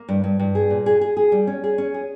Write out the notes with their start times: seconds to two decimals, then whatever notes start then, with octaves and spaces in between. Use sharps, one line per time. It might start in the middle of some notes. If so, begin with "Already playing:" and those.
Already playing: A#3
0.09 G2
0.24 G2
0.39 G2
0.55 G#4
0.70 A#2
0.86 G#4
1.01 G#4
1.17 G#4
1.32 G3
1.47 C#4
1.64 G#4
1.78 C#4
1.94 G#4